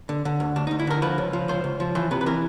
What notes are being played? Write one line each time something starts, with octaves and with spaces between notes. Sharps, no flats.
D3
D3
D2
D2 D4
D#4
D2
E4
D3 A#4
F3 B4
C#2
F3
C#2 C5
C#2
F3
E3 C5
C3 B4
B4
E3 A#4